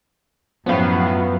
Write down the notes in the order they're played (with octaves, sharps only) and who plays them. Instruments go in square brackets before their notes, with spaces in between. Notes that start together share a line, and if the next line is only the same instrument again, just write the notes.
[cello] F#2 F#3 [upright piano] A2 C#4 [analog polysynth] F3 F5 [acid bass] B3